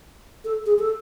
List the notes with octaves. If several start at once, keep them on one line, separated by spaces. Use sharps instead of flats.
A4
G#4
A4